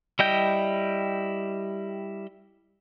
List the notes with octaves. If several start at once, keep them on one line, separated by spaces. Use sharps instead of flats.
G3 E4 D#5 G5 G6